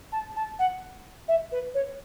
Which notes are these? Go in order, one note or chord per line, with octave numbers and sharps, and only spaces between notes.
A5
A5
F#5
E5
B4
C#5